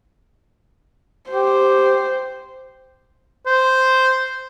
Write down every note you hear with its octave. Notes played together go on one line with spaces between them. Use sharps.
G4 C5
C5